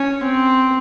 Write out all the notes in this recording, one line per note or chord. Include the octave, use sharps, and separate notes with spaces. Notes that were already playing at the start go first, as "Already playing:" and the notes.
Already playing: C#4
C4